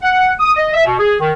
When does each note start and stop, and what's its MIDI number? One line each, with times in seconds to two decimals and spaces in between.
0.02 0.30 78
0.39 0.52 87
0.56 0.71 75
0.74 0.85 76
0.85 0.97 47
0.99 1.14 68
1.20 1.32 51